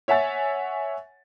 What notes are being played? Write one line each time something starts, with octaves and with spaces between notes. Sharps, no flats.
C#5 E5 F#5 G#5 A6